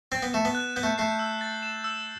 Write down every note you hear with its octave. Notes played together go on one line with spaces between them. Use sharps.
C4 A6
B3
A3 E7
B3
F#6
B3 G6
A3
A3 C7
E6
A6
E7
E6